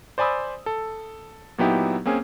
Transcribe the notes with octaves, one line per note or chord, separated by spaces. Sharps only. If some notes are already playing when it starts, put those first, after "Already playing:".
C5 D5 G#5 B5 D#6 E6
A4
A#2 F#3 B3 D#4 E4 G4
A#3 C4 C#4 G#4